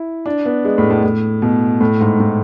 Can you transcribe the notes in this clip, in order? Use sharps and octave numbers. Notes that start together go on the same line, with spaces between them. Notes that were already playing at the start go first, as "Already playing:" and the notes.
Already playing: E4
D4
B3
G#3
A2
A2
A2
B2
A2
G#2
A2